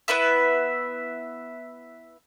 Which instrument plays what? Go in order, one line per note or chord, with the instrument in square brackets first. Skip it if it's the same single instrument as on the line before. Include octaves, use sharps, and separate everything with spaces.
[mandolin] B3 E4 B4 E5